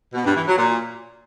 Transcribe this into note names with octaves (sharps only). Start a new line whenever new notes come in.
B2
G2
E3
F#3
A#2